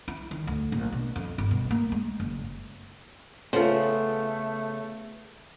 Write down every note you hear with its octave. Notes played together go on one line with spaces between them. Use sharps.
E4
D#3
D2
A#1
B2
F2
G1
B2
A#3
G#3
F#1
C#3 A3 B3 F4 A4 C5